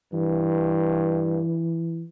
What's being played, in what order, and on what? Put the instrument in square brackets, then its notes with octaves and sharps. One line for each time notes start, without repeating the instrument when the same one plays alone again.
[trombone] G2 [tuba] E3